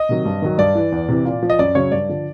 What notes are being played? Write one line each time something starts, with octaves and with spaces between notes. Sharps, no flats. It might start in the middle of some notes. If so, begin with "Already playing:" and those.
Already playing: D#5
C3 D#3 F#3
G2
D#3 F#3
G2 D5
E3
E2
C3 E3
A#2
F3
D#5
F#2 D5
C#3 F#3 C#5
G2 D5
D3 F3